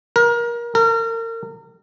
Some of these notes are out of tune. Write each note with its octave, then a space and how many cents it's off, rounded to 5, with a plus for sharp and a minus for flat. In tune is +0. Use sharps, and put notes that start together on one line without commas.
A#4 +25
A#4 -35